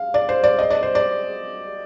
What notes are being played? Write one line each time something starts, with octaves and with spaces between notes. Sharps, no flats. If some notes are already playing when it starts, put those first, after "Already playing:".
Already playing: F5
D5
C5
D5
D#5
D5
C5
D5